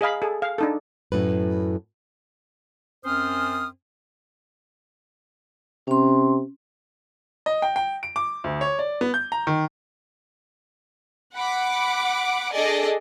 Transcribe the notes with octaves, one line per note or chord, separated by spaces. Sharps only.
G#4 D#5 F5 B5
G#4 A4
F5
D4 D#4 A4
F#2 A2 B4
F#2 C4 C#4 C5 D#6 F6
C3 C#4 C6
D#5
G5
G5
D7
D6
D2
C#5
D5
B3
G6
A#5
D#3
F#5 B5 D6
D4 G#4 A4 D5 D#5 G#5